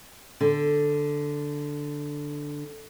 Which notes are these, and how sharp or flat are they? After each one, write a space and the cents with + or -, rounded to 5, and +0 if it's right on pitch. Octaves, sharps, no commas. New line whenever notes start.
D3 +0